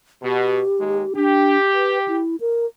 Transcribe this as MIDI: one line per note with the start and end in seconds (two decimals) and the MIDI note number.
0.22 0.62 47
0.22 1.13 67
0.79 1.04 39
0.79 1.04 51
0.79 1.04 56
1.16 1.56 62
1.16 2.21 67
1.73 1.98 71
2.08 2.36 64
2.40 2.66 70